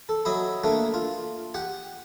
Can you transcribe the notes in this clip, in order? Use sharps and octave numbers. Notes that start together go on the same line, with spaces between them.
A4
F#3 D#5 E5 B5
A3 A#3 D4
F4
G4 F#5